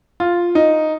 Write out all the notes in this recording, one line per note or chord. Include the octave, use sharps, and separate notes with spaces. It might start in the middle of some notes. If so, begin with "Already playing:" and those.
F4
D#4